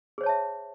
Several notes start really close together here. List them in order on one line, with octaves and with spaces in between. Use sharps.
G#4 C5 C#5 A5 E5